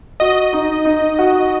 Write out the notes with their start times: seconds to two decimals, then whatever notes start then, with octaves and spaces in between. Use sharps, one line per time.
0.20 F#4 D#5
0.53 D#4
0.85 D#4
1.19 F#4